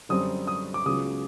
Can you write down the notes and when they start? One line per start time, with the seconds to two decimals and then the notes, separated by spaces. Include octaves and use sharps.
0.09 F#2 D3 G3 C4 D#6
0.47 D#6
0.74 D6
0.86 C#2 C#3 F#3 B3 D#6